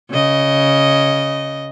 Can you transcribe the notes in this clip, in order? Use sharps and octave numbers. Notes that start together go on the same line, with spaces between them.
C#3 D#5